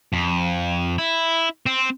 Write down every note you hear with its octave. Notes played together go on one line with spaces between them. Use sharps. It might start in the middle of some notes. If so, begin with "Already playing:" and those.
F2
E4
C4